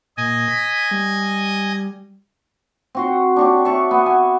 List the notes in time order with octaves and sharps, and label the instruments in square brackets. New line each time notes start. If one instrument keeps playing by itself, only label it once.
[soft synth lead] A#2 [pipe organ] D#5 G#5
[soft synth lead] B6
G3
[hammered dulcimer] C4 F#4 C6
D4 F#4 G4
E5 F#5 A5 C#6
B3
G#5